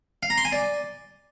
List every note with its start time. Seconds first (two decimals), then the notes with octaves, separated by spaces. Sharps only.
0.23 F5
0.30 A#5
0.38 C6
0.45 G#5
0.52 D5